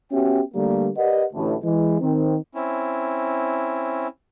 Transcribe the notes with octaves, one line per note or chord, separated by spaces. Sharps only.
B3 C#4 F#4 G4 E5 G5
D3 G3 A3 A#3
G4 A#4 B4 D5 D#5 F#5
A1 D2 A2
E3 G#3
D#3 C4
C4 C#4 E4